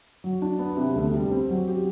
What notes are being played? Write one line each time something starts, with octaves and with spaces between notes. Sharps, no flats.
F#3
D4
B3
C3
D2
G3
C4
F#3
G4